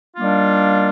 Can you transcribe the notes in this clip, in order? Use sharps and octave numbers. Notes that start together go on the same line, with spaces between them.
D#3 G3 A#3 D4 F4